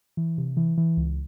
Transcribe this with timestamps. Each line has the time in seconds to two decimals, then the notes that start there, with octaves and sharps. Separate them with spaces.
0.17 E3
0.38 C3
0.57 E3
0.78 E3
0.97 C#2